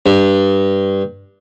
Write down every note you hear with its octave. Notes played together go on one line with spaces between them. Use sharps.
G2